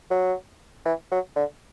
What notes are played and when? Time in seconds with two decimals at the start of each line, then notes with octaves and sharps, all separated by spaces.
0.11 F#3
0.85 E3
1.11 F#3
1.36 D3